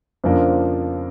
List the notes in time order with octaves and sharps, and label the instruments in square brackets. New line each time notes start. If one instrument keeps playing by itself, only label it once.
[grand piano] F2 C#3 F3 A#3 D4